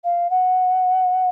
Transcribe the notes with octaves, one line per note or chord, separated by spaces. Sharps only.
F5
F#5